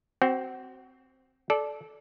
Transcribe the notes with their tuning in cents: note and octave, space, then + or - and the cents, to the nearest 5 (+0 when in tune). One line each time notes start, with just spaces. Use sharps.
C4 +0 F#4 +25
A4 -25 D5 +0